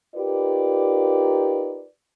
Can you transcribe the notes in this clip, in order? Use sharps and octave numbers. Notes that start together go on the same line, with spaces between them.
D#4 F4 G4 A#4 B4 D5